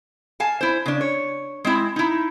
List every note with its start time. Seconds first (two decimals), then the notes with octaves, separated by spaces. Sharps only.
0.40 F5 G#5 A5
0.61 E4 C5
0.86 C#3 D4
1.01 C#5
1.65 G#3 C4 E4
1.96 D#4 E4